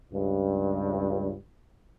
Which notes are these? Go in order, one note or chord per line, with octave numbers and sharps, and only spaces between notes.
C#2 G2